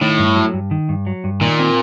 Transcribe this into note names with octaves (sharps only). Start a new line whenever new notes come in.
A2 D#3
G2
F#3
G2
D#3
G2
F#3
G2
A#2 D#3
C4